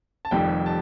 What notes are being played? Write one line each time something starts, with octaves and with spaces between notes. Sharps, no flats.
A5
F1 F2 D#3 G3 G5
A5